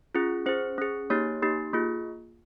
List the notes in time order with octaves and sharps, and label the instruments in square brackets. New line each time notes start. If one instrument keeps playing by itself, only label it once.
[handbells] C#4 F4 G#4
C#4 G#4 C5
C#4 G#4
A#3 D#4 G4 C#5
A#3 D#4 G4
A#3 F4 G#4